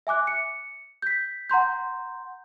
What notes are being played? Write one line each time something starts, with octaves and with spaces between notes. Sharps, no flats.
E5 G#5 D6 F#6
C#7
G6 B6
F#5 A#5 C6 G6